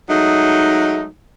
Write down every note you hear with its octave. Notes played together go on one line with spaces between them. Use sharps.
F#3 G#3 A3 D#4